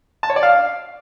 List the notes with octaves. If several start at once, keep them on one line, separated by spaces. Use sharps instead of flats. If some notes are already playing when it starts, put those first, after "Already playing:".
A5
C#5
D5
F5